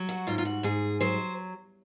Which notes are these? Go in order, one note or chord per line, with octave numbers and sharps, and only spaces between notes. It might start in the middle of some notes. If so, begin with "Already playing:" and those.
Already playing: F#3
F#4
G#2 F4
F4
F#4
G#2 G#4
F#3 C5